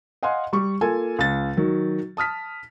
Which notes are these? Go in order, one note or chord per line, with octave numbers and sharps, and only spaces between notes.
D#5 F5 F#5 G#5 C6
G3 C#6
A#3 F4 A4 G#5
C#2 A6
D#3 F#3
A5 D#6 F6 B6